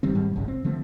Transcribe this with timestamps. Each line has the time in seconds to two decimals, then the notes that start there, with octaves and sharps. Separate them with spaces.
0.03 F#1 D#3 G3 C4
0.15 G#2 D#3 G3 G#3
0.36 F#1 C2 G#2 C#3
0.48 C4
0.64 D3 F3 A3 C4